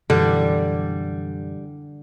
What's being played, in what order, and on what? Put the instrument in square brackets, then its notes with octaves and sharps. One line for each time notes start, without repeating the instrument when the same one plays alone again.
[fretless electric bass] F#2 B2 E3 [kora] D3 [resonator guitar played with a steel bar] G3